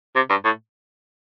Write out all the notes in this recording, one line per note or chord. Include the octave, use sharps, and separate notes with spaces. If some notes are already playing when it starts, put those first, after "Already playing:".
C3
G2
A2